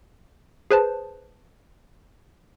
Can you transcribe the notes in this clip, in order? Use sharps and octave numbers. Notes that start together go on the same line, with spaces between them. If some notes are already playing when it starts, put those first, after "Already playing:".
G#4 B4 C5 A5